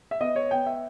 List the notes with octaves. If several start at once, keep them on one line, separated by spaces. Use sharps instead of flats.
E5
B3 D#5
C#5
B3 G5
E5